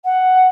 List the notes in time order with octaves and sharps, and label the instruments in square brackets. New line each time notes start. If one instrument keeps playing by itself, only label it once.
[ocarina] F#5